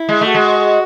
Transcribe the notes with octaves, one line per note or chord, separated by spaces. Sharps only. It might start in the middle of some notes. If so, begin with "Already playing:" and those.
Already playing: E4
G#3
A3 F#4
G#3